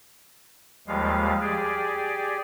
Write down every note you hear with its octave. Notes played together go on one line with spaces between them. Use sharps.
D#2 F3 G3 G#3 F5
G4 G#4 D5